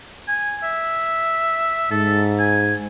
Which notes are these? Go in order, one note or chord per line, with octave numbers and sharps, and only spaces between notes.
G#5
E5
G#2 A4
G#5